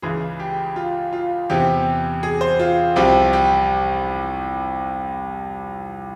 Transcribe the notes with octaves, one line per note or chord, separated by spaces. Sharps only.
C#2 C#3 E3 G#4
G4
F4
F4
E2 C3 E3 G4
G#4
C5
F4
C2 C3 F3 G4
G4